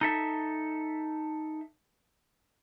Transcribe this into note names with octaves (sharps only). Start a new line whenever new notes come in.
D#4 A4 E5